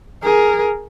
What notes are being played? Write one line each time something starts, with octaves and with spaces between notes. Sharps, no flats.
G#4 A#4